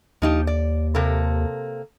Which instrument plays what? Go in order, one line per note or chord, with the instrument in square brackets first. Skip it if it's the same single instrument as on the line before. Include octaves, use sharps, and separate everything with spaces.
[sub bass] D#2 [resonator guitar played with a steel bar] F3 D#4 G4
[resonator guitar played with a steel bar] D5
C3 A#3 A4